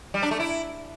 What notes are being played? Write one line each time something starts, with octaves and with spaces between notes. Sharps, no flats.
G3
D4
A3
E4